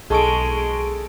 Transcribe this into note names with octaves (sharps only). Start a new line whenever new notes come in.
B1 G#3 G#4 A4 C#6 D7